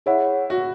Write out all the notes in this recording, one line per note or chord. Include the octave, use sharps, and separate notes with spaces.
E4 G#4 C#5 F#5
F#4